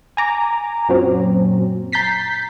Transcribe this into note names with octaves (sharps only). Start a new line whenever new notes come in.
G#5 A#5 D6
F#2 A#2 F#3 C4 C#4
A#5 G6 A6 B6 C7